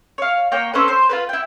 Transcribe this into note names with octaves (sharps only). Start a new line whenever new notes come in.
C#5 F5
A#3 C#5 G5
C4 C#4 A4 B4
C5
F4 A#4 B4
E4 G5